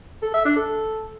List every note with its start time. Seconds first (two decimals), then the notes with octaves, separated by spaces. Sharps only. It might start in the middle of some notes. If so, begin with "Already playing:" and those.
0.22 A4
0.34 E5
0.45 D4
0.56 A4